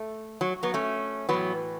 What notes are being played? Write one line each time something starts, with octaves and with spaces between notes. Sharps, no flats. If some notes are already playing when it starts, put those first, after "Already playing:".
Already playing: A3
F#3
F#3 B3
A3 C#4
A2 E3 F#3 B3